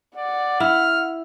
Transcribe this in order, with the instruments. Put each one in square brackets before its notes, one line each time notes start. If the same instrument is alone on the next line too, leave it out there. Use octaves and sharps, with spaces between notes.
[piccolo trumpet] D5 [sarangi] F#5
[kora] E4 [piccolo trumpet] F6